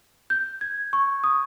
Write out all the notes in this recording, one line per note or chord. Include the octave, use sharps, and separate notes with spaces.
G6
G#6
C#6
D#6